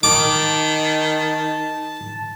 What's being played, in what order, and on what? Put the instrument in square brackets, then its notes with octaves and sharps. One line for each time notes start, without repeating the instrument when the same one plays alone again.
[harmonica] D#3 [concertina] A5 [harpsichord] D6